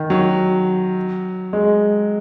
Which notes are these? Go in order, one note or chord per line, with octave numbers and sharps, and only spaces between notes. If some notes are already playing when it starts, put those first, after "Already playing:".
Already playing: D#3
F#3
G#3